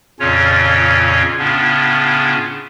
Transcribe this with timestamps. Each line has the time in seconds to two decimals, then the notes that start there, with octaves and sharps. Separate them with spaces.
0.20 F2 A#2 C#3 C#4 F4 C#5
1.39 A2 C#3 B3 C#4 D4 F4